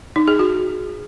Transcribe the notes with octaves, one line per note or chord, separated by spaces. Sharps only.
D#4
G#4
F#4